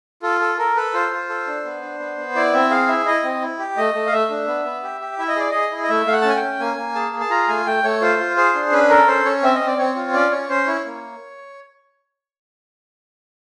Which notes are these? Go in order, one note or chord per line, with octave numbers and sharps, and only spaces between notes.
F4 A4
A4
A4 A#4
A4 B4
F4 C5
F4
A4
D4
B3
D4
B3
B3
E4 D5
C4 E5
G#4 F5
E4 E5
E4 D#5
C4
E4
G4
A3 D#5
A3
F5
A3 E5
D4
B3
B3
G4
G4
E4 E5
D#5
G#4 D5
G#4 D#5
E4
D#5
A3 E5
A3 F5
F#5
A5
C#4 G#5
G5
C#4
A#3 G#5
A#3
G#4 A5
G#4
A5
F4 A#5
A3 G#5
A3 G5
A3 C#5
F4 C5
F4
G#4 C5
D4
C#4 B4
A4 A#4
C#4 C5
C#4 C#5
C4 E5
D#5
C4
D5
C4 C#5
F4
C#4 D5
C#4 C#5
C#4 C5
E4 C#5
A#3